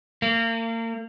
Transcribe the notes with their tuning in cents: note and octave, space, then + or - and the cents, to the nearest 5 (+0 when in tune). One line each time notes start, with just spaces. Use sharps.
A#3 -35